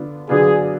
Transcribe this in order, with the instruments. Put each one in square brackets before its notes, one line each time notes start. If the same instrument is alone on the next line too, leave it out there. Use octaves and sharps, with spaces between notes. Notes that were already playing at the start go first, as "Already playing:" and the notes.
Already playing: [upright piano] D3 B3 D4 F4
[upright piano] D3 F#3 B3 D4 F4 [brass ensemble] G#4